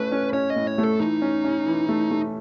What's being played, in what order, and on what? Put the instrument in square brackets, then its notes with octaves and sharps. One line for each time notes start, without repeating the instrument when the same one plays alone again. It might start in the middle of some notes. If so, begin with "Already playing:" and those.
Already playing: [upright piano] A3 C#4 [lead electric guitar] B4
[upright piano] C#4
[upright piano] C#4 [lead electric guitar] C#5
[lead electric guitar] D#5
[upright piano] A2
[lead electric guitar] C#5
[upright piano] A3
[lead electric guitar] A4
[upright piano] E3 [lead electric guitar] D#4
[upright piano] C#4
C#4
E3
A3
A3